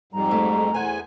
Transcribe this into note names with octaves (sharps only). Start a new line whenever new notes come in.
F2 G#2 G3 A#5
A3
E2 C5 F#5 G#5